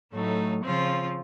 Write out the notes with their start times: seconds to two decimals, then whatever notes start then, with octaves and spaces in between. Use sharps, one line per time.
0.13 A2 F#3 A3 D#4
0.64 C#3 F3 C4 F4